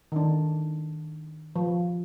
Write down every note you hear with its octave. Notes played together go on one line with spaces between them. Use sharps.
D#3 D4
F3